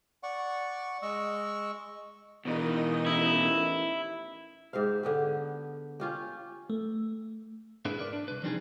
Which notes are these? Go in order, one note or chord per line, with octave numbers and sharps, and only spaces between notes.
D5 F#5 C#6
G#3 D#5 C#6 E6
B2 D#3 E3 D#4 D#5
A1 E4
G#2 G4 C5 F5
D3 B3 G4
C#4 F4 G4
A3
G#2 D4 E4 G#4 B4
A#4 B4 D5
D4
C2 B4
F3 G3 C4 D4 D#4 G#4